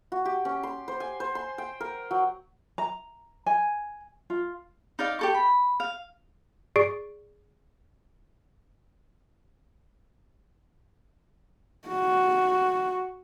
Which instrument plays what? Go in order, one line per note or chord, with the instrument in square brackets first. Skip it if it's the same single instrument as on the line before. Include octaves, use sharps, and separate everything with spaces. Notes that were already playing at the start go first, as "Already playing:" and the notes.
[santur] F#4
G4
C#4
C6
C5
G#5
C5
C6
G5
A#4
F#3
[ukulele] A#5
G#5
F4
[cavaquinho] D#4 D5 F5
G4 A4 C#6
B5
F5
[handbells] G#4 D5 C#6 C7 D7
[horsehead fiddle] F#4